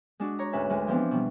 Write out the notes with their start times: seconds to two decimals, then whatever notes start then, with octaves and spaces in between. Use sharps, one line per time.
0.20 G#3 D4 F#4
0.39 C#5 A#5
0.53 D2 G#2 C#4 B4 E5 G#5
0.70 D2 G#3
0.87 E3 F3 B3 C4 D4
1.11 B2 G3